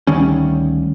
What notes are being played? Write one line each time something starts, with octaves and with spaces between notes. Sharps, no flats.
D2 D#3 G3 C#4